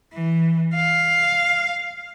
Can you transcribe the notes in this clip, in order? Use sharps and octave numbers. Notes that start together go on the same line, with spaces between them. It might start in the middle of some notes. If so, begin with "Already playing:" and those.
E3
F5